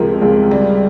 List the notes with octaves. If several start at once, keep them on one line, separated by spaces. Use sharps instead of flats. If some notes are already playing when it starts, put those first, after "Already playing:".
Already playing: C#2 C3 F3 G#4 A#4
C#2
G3